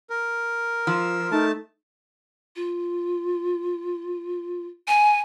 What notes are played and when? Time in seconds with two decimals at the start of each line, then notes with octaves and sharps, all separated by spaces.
0.10 A#4
0.87 F3 E6
1.32 A3 D#4 A5
2.56 F4
4.88 G#5